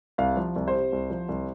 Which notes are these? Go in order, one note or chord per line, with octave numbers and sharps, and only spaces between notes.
C2 F5
F3
C2
C5
C3
C2
F3
C2